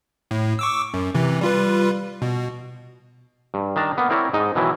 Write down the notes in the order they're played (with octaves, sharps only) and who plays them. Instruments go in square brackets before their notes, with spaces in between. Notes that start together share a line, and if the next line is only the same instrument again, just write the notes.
[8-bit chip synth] A2
C#6 D6 E6
F#2
C3 E3
G3 F4 B4
B2
[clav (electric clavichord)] G2
D#3 D4 A5 A#5
A#3 B3
C4 E4 A#4 C#5 D5
G#2 D#4 D#5
B2 D#3 E3 F#3 E4